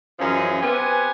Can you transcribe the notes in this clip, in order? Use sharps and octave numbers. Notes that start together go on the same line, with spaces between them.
F#2 E3 F3 C#4 G#4 D#5
B3 C4 G4 B4 G#5